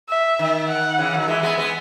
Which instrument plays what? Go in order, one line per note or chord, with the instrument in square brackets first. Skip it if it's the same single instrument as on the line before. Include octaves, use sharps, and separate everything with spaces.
[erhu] E5
[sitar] D#3
[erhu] F#5
[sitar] C#3 E3
D#3 F#3
[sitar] E3 G#3 [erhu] E5
[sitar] G#3 B3
G#3 B3